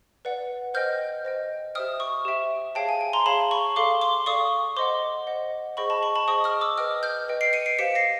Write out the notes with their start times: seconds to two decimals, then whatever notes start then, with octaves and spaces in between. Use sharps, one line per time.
0.25 B4 D5 F#5
0.74 C5 D#5 G5 F6 G6
1.25 C5 D#5 G5
1.75 G4 C5 E5 G5 D#6 F6
2.00 C#6 D#6
2.25 G4 C5 E5 G5
2.75 G#4 C#5 F5 G5 A5
2.89 G#5
3.01 G#5
3.13 A#5 C6
3.26 G#4 C#5 F5 A5 B5
3.51 B5 C#6
3.76 A4 D5 F5 C6 D6
4.01 C6 D6
4.26 A4 D5 F5 C#6 D#6
4.77 C5 D#5 F#5 C6 D6
5.27 C5 D#5 F#5
5.77 G#4 C5 D#5 G5 B5 C#6
5.90 A5 B5
6.02 B5 C#6
6.15 A5 B5
6.28 G#4 C5 D#5 G5 C#6 D#6
6.44 D#6 F6
6.61 D6 E6
6.78 B4 D#5 G5 D#6 F6
7.03 F6 G6
7.28 B4 D#5 G5
7.41 C7 D7
7.53 C#7 D#7
7.66 C7 D7
7.79 G4 C5 F5 B6 C#7
7.95 A#6 C7